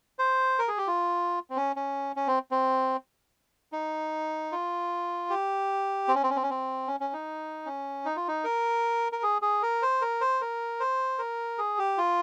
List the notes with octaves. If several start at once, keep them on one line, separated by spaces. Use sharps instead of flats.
C5
A#4
G#4
G4
F4
C4
C#4
C#4
C#4
C4
C4
D#4
F4
G4
C4
C#4
C4
C#4
C4
C#4
C4
C#4
C#4
D#4
C#4
D#4
F4
D#4
A#4
A#4
G#4
G#4
A#4
C5
A#4
C5
A#4
C5
A#4
G#4
G4
F4